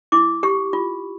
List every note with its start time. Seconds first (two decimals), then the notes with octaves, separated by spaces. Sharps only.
0.12 E4 D6
0.43 G4 C#6
0.73 F4